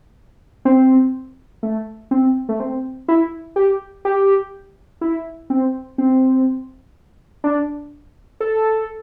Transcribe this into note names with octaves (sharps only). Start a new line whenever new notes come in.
C4
A3
C4
A3
C4
E4
G4
G4
E4
C4
C4
D4
A4